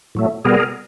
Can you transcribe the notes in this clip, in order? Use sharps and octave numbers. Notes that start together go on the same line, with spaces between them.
A2 F#3 A3
B2 G3 B3 G#4 A#4